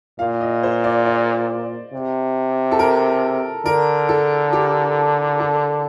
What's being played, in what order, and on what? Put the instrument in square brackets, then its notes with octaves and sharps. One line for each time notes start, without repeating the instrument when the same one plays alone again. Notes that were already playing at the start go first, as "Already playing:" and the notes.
[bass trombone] A#2 [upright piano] F5
[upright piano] D#5
C5
D5
D5
[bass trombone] C3
[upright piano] A4
A#4
[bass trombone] D3 [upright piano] A#4
[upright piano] A4
G4
A4